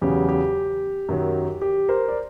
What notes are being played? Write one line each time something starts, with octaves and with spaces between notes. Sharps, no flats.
E2 C#3 F#3 G4
G4
F#2 D#3 F#3
G4
A#4 C5
D5